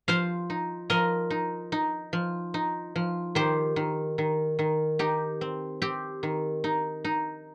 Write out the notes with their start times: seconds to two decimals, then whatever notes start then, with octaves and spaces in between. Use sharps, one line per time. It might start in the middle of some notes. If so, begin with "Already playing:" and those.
0.08 F3 C5 F5
0.50 D#4
0.90 F3 A#4 D#5
1.31 D#4
1.72 D#4
2.13 F3
2.54 D#4
2.96 F3
3.35 D#3 G4 C5
3.76 D#3
4.18 D#3
4.59 D#3
4.99 D#4 G4
5.41 C4
5.82 C4 G4
6.23 D#3
6.64 D#4
7.05 D#4